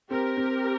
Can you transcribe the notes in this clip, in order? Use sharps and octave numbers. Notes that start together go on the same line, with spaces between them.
C4 G4 A#4
C4